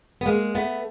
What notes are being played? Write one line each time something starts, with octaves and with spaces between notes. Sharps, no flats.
B3
G#3 A#3
A3 B3